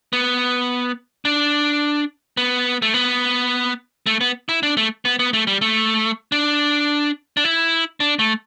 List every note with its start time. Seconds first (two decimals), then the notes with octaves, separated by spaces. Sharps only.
0.13 B3
1.25 D4
2.37 B3
2.82 A3
2.94 B3
4.06 A3
4.21 B3
4.49 E4
4.63 D4
4.77 A3
5.05 B3
5.19 B3
5.33 A3
5.47 G3
5.61 A3
6.32 D4
7.37 D4
7.44 E4
8.00 D4
8.19 A3